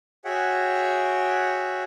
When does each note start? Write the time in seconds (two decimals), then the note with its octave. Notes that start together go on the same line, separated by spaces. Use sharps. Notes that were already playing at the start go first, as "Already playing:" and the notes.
0.25 F#4 G#4 C#5 E5 F#5 G5